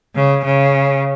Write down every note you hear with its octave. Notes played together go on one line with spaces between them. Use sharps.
C#3
C#3